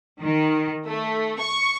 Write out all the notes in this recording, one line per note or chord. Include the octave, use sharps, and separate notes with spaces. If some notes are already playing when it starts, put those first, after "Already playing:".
D#3
A3
C#6